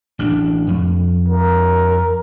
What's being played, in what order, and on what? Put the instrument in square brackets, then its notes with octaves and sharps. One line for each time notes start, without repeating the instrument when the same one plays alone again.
[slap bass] A1 D4
F2
[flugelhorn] A#4